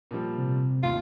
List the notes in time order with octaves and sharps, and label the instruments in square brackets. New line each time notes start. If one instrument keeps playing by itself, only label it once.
[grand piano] A#2 F3 G3
[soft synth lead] C3
[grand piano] A1 D#2 [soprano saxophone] F4